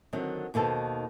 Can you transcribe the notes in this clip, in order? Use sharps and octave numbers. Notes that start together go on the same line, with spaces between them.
D3 D#3 F#3 C4
D#2 B2 D#3 A4 C5